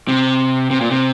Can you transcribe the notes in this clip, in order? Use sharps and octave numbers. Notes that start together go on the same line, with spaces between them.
C3
C3
A#2
C3